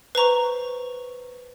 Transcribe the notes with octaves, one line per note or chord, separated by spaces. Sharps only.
B4 C5 A#5 C#6